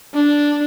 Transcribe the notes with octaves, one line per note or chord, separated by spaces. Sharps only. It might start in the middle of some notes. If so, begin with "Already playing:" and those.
D4